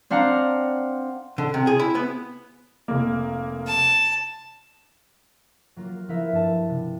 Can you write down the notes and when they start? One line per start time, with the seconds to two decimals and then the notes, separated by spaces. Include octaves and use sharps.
0.10 C4 D4 F5 F#5 A#5
1.38 D3
1.54 C3
1.67 G#4
1.79 E4
1.95 B3
2.88 F1 A#3
3.66 A5
5.76 F#3 A#3 F4
6.08 F3 B3 E4 A#4 E5
6.32 G2 A5
6.69 C3